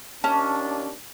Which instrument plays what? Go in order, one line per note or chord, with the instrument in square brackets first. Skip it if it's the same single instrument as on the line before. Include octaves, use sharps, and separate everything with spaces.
[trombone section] D#2 D4 [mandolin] C#4 [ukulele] A5